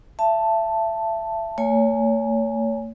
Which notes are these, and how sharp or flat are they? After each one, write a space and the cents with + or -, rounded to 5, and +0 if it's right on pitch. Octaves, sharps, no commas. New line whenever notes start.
E5 +30 A5 +0
A3 +45 C#5 +30 G#5 +0